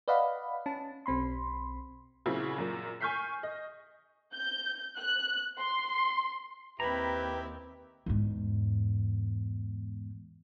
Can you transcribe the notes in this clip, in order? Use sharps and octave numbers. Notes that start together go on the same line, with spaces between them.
B4 D5 D#5 F5 F#5 B5
C#4 A5
B1 C4 B5 C6
A#2 C#3 F#3 C4 E4
F#2 A#2
G#5 C#6 F6 G6 B6 C7
D#5
G6
F#6
C6
D#2 C4 E4 G4 B4 A#5 B5
E2 G#2